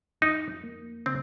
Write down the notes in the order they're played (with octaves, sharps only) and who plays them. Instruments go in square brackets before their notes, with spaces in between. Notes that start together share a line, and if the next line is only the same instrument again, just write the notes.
[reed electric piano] F2 [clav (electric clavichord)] D#4
[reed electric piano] A#3
[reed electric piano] C#3 [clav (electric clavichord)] C4